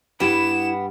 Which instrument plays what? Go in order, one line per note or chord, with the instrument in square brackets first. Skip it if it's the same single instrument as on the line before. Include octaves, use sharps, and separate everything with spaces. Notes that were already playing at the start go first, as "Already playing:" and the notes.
[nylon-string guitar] G2 G4 [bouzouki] B3 [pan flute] E4 [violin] E7